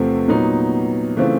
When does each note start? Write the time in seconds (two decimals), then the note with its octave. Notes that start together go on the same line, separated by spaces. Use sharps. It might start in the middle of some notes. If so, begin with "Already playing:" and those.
Already playing: E2 C3 F3 A3 C4
0.28 A#2 F#3 B3 D#4
1.16 C#3 E3 A3 C4 F4